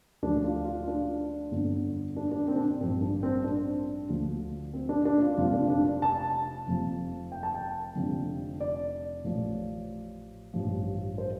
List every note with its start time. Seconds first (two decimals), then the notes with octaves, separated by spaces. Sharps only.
0.23 D2 D3 F3 D4
0.45 F4
0.65 F4
0.88 D4
1.51 G1 F2 D3 F3
2.16 D4
2.32 D4
2.48 C4
2.56 D4
2.64 C4
2.80 A1 G2 F3 C4
3.01 D4
3.23 C4
3.44 D4
4.09 D2 D3 F3
4.74 C4
4.89 D4
5.05 D4
5.22 F4
5.37 F1 F2 C3 F3 F4
5.53 D4
5.70 D4
6.02 A5
6.67 F1 F2 F3
7.32 G5
7.43 A5
7.54 G5
7.95 F1 F2 D3 F3
8.60 D5
9.24 A1 A2 F3
10.53 A1 G2 F3
11.18 C5